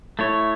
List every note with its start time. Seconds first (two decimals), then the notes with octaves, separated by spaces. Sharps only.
0.19 A3 E4 C#5